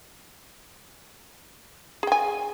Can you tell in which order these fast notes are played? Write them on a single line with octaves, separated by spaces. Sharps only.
G#4 G5 G#5